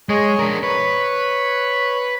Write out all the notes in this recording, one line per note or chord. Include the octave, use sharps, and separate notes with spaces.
G#3 G#4 C#5 D#5
D4 A#4
B4 C#5